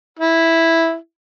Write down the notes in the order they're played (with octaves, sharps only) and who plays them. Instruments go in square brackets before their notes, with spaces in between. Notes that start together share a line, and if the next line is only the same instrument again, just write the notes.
[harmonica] E4